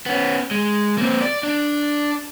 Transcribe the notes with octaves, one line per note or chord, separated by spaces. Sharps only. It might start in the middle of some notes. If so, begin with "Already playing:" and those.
B3 C#4
G#3
A#3 C4
D5
D4